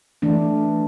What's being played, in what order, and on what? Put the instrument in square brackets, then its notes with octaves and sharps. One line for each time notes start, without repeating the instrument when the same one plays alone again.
[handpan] E3 A3 D4